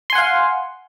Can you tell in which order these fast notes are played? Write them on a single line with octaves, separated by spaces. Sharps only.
C6 G#5 F#5 F5